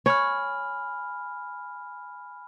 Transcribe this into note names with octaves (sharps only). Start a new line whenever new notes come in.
C#5 G#5 B5 F6